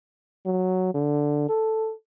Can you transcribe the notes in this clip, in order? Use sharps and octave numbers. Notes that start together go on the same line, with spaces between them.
F#3
D3
A4